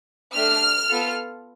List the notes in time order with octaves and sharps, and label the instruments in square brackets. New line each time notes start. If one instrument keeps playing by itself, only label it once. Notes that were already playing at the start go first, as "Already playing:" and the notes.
[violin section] A3 D4 G4 F6
B3 F4 A4